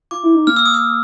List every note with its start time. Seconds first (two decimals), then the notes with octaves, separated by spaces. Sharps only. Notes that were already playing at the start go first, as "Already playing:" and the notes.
0.11 F4 D6
0.23 E4
0.35 D#4
0.47 A#3 F6
0.56 E6
0.65 D#6
0.74 E6